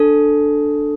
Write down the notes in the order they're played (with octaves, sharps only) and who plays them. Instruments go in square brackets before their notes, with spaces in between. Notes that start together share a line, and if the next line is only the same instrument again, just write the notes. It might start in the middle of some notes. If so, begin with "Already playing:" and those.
Already playing: [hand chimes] D4 A4